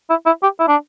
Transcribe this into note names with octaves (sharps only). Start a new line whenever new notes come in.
E4
E4
G4
E4
D4